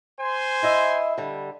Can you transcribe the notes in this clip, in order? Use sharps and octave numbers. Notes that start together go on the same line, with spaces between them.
C5 G#5 C6
E4 D#5 E5
D3 G3